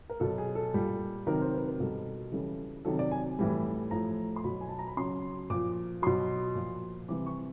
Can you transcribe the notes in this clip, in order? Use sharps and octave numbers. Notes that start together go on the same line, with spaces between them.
A#4
B2 F#3 A4
G#4
A4
A#2 G3
C3 D#3 F#3 A#4
C5
B4
A#4
B2 G3 A4
C#3 E3 G3 A4
C3 D#3 F#3 A4
D5
G#5
A2 E3 G3
A2 F3 A#5
C6
B2 F#3 B5
G#5
A5
A#5
B5
C#3 F#3 C6
A#2 F3 D6
B2 F#3 C6
A#2 F3
C3 E3 G3 D6
C#6